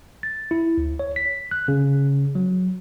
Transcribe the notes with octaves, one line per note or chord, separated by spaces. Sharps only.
A6
E4
D2
C#5
B6
F#6
C#3
F#3